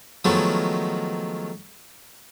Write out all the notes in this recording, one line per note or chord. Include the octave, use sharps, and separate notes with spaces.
D#3 F3 F#3 G#3 A3 B3